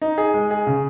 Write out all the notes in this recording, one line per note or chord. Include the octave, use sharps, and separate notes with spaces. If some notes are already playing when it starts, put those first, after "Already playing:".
D#4
G#4
G#3
G#4
C#3